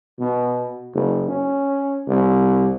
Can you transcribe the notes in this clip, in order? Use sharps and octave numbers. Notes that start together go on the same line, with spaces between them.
B2
F#1
C#4
C2